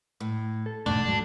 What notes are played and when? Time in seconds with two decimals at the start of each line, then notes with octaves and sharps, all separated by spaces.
0.20 A2
0.66 A4
0.86 E1 G#2 D3 A3 D4
1.07 F#3